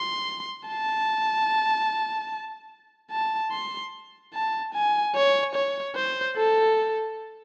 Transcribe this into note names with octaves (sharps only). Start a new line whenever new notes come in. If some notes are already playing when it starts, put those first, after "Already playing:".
Already playing: C6
A5
A5
C6
A5
G#5
C#5
C#5
C5
A4